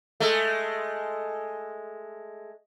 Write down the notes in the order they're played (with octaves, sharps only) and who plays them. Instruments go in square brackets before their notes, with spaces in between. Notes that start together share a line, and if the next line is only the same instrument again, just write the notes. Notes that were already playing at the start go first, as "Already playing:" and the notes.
[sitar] G#3 A3